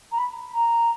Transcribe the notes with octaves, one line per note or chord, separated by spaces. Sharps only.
A#5
B5
A#5